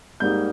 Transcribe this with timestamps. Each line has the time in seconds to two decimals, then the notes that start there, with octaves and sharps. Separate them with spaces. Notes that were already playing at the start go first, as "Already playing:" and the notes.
0.20 G#2 G3 A#3 D#4 G6